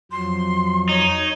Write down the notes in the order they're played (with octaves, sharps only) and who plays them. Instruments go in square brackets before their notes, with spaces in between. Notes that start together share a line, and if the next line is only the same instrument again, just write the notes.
[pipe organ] F2 F3 F#3 [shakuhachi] C6
[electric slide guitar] D#4 [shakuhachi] C#5